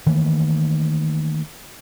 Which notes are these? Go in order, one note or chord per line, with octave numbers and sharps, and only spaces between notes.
D#3 E3 A3 A#3